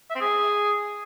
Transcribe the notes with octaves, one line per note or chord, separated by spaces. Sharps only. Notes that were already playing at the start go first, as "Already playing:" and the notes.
E5
C4
G#4